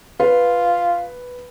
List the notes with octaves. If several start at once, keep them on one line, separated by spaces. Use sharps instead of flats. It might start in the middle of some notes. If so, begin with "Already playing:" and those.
F4 B4